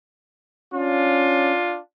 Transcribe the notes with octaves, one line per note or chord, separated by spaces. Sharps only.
C#4 D4 F4